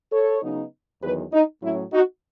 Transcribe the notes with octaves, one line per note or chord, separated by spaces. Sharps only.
A4 C#5
C#3 F#3 B3 D#4
E2 D#3 F#3 G#4 B4
D#4
A2 F#3 C#4 E4
D#4 F#4